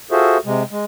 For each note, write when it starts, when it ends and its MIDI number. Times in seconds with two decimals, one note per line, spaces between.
0.11 0.37 65
0.11 0.37 66
0.11 0.37 68
0.11 0.37 69
0.11 0.37 72
0.11 0.37 76
0.45 0.63 48
0.45 0.63 56
0.71 0.85 56